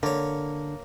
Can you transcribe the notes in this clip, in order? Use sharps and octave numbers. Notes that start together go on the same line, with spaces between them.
D3 A#3 C#5